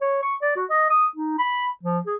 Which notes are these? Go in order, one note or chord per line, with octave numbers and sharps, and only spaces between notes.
C#5
C#6
D5
F#4
D#5
D#6
D#4
B5
F3
G#4